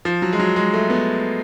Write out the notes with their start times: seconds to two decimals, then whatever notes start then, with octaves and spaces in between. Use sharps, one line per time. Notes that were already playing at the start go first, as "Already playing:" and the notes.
0.05 F3
0.22 F#3
0.33 G#3
0.39 F#3
0.56 G#3
0.73 A3
0.90 B3